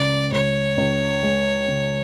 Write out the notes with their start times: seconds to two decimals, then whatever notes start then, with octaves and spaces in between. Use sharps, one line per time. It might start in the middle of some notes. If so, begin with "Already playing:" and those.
Already playing: C#2 C#3 G#3 D5
0.32 C#2 C#5
0.78 C#2
1.23 G#3
1.68 C#3